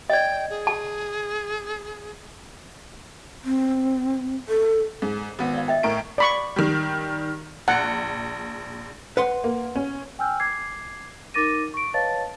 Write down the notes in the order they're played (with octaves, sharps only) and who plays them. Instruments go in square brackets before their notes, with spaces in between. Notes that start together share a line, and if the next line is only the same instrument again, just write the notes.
[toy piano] D5 D#5 [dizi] G5
[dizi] G#4
[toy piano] A5
[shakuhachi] C4
A4
[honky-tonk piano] G#2
G#1 B3
[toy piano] D5 F5
D#5 E5 G5
[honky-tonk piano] A2 A#4 D7
[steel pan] D5 B5 C#6
[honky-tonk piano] D#3 G3
[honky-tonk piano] A#1 [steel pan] F#5
[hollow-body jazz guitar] B4 F#5 C6
[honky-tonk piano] A#3
C#4
[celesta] G5 G#5 E6 F6 G6
D6 G#6 C7
D#4 A#4 D6 A6 A#6 D#7
C#6 D7
B4 C#5 D#5 F5 A5 A6